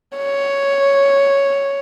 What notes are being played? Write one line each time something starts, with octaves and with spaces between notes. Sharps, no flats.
C#5